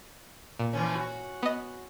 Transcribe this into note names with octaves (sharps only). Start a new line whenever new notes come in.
A#2
E3 F3 C#4
F#4
B3 D#5